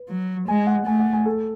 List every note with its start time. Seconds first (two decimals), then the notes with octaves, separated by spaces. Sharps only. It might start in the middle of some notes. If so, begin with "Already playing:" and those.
Already playing: B4
0.09 F#3
0.48 G#3 G#5
0.67 F#5
0.86 A3 G#5
1.00 F#5
1.13 G#5
1.25 A4